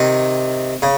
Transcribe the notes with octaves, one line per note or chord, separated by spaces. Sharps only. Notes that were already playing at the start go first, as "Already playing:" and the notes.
Already playing: C3 D#3
C#3